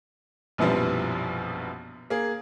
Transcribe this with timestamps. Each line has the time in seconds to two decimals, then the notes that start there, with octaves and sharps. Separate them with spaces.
0.58 A#1 F#2 B2 E3 F3 G3
2.10 A#3 G#4